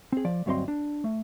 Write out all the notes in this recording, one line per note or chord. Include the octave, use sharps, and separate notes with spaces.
C4 G#4
F3 D5
D2 G2 F#3 C4 D#5 C6
D4
A3